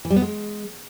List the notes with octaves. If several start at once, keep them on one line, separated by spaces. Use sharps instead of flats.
E3
G3
B3
G#3